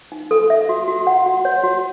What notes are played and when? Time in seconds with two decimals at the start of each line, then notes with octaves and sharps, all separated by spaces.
0.12 D#4
0.31 A4
0.50 E5
0.69 F#4
0.88 F#4
1.07 F#5
1.26 F#4
1.45 C#5
1.64 F#4